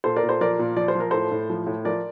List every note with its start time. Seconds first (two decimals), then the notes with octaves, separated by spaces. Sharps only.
0.04 A#2 A4 C5
0.16 A#4 D5
0.23 A#2
0.29 A4 C5
0.41 F3 A#4 D5
0.59 A#2
0.76 F3 D5
0.88 C5
0.95 F3 A#4
1.11 A2 A4 C5
1.32 A2
1.50 F3
1.67 A2
1.85 F3 A#4 D5